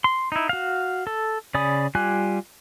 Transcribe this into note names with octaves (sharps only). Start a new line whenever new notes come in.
C6
D#4 E4
F#4 F5
A4
C#3 D5 G#5 B5 D#6
G3 F4 G4 G#5 F#6